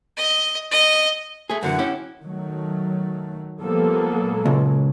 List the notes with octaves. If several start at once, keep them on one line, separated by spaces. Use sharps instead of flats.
D#5
D#5
A3 G#4
F#2 D3 E3 F#5
C#4 E4 G4
D#3 F#3 A3
F3 G3 A#3 B3 A4
A#2 F#3 G#3
C#2